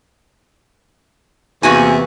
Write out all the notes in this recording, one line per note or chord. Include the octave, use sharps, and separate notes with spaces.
E2 C3 E3 A#3 F#4 G#5